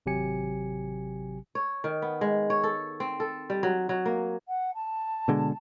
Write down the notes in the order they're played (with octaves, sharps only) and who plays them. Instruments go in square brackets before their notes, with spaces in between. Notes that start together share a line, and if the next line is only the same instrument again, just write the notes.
[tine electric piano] G#1 C3 F#3 G4 G#5 C#7
[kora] C#5
D#3
B3
G#3
C#5
A4
C4
A4
G3
F#3
F#3
A#3
[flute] F#5
A5
[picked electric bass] B2 D3 G#3